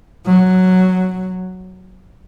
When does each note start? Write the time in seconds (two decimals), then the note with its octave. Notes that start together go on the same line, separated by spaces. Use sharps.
0.26 F#3